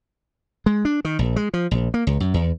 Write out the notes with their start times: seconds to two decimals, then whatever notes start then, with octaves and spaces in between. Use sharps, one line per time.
0.66 G#3
0.85 D4
1.05 D#3
1.19 A#1
1.36 G#3
1.54 F3
1.71 A#1
1.94 A#3
2.07 C#2
2.20 F#2
2.34 E2